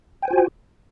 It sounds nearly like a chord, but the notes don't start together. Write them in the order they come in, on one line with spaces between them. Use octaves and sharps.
G5 G#5 C5 F4 F#4